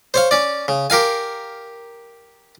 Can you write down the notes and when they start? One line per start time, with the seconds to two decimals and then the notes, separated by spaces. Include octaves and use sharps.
0.14 C5 C#5 F5
0.31 C#4 D5
0.68 C#3
0.90 G4 A#4 F5 G#5